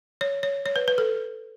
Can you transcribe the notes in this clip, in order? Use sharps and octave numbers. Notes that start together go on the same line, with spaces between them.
C#5
C#5
C#5
B4
B4
A4